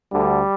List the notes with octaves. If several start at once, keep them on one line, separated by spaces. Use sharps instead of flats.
D2 D3 G3